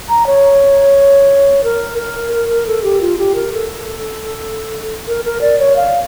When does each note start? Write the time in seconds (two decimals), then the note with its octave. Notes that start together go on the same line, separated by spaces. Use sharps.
0.09 A#5
0.26 C#5
1.64 A#4
1.98 A#4
2.32 A#4
2.49 A#4
2.67 A4
2.84 G4
3.01 F4
3.18 G4
3.35 A#4
3.53 A4
5.08 A#4
5.25 A#4
5.41 D5
5.59 C#5
5.76 F5